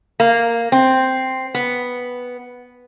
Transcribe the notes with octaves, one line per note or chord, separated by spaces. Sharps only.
A#3
C4
B3